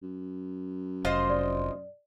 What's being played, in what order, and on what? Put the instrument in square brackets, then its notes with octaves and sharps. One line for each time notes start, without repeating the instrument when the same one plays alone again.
[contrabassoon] F#2
[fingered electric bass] F1 [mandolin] F4 C5 D#5
[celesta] D5